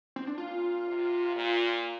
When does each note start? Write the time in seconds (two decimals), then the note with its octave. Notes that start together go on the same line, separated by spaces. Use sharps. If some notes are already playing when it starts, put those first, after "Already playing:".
0.16 C4
0.27 D4
0.38 A#2 F4
0.87 C3
1.36 A#2